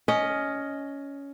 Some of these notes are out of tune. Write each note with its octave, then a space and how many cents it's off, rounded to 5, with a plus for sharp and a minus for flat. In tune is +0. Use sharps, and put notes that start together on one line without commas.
C#4 +15 D#5 +0